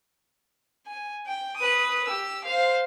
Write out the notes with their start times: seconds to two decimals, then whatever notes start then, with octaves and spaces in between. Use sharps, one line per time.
0.87 G#5
1.27 G5
1.57 B4 D#6
2.08 G4 E6
2.45 C5 F5